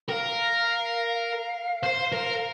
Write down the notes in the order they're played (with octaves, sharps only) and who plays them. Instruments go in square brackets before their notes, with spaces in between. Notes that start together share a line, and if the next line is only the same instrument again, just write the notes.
[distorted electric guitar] A#4 [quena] F5 G5
[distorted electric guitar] C5
A#4